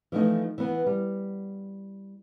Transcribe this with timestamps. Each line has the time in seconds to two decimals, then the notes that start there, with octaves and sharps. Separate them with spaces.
0.12 E3 F3 A3 D#4
0.58 E3 B3
0.86 G3